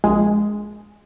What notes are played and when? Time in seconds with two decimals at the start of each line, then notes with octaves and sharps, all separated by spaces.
0.04 A#1 G#3